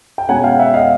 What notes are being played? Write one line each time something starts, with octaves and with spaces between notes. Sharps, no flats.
G5
B2 G#3 C#4 F#5 G#5
F#5
F5 G5
E5 F#5
D#5 F5